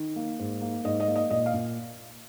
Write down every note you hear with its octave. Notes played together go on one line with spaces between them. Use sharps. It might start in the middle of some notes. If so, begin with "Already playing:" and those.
Already playing: D#3
A#3
G#2
A#3
G#2 D#5
D#5
A#3
D#5
A#2 D#5
F5
A#2